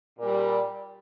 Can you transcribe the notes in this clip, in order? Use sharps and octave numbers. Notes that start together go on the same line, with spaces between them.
A#2
G3